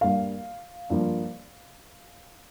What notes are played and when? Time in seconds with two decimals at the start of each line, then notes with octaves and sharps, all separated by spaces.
0.01 G2 G3 A#3 F5
0.90 G2 F3 A#3